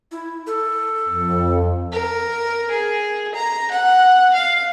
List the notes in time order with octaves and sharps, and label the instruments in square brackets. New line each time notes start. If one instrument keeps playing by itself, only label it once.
[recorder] E4
A4
[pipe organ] F2
[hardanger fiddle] A#4
G#4
A#5
F#5
F5